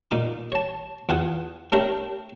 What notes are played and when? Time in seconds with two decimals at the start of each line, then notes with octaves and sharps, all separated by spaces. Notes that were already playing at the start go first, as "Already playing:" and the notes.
0.11 A#2 D#4 D6
0.52 C#5 A5
1.09 E2 F4 F#5 G#5 D#6
1.72 A3 C4 D4 G4 A#4 C#5